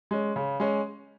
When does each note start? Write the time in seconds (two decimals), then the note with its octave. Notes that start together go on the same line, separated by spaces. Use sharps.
0.11 G#3 C#4
0.36 C#3
0.60 G#3 C#4